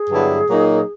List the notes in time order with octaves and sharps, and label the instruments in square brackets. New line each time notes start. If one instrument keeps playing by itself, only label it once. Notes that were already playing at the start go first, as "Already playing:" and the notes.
Already playing: [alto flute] G#4
[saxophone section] G2 D3 F#3 B3 E4
A#2 F#3 A#3 D#4